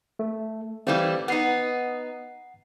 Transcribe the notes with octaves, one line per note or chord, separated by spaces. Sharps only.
A3
E3 G3 A3 C4 C5 F5
B3 D#4 F#5 C7